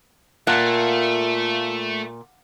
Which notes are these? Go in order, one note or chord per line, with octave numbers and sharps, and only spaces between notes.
A#2 A3 F5 F#5 A5